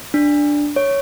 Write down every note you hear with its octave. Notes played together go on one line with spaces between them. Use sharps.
D4
C#5